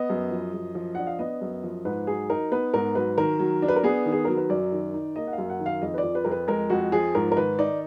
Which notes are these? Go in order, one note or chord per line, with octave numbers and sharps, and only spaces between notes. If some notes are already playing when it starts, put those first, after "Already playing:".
Already playing: B3 D#5
F#2
F3
F#2
F3
D4 F#5
F5
B3 D#5
F#2
F3
G#2 B4
F#3 G#4
D#4 A#4
B3 B4
G#2 A#4
F#3 B4
D#3 A#4
F#3
D4
B4
A#4
B3 G#4
D#3
G#4
F#3 A#4
B4
F#2 D5
D#3
D#4
A#3 D#5
F#5
F5
F#2
F#5
D#3
F5
F2 D#5
B4
D5
F3
B4
F2 A#4
B4
G#3 A#4
F2 F#4
F3 G#4
G#2 A#4
A#4
D#3 B4
D#4 D5